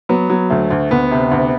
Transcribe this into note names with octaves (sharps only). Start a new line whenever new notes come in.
F#3 B3
F#3
D2 A3
D2
D2 B3
C3
D2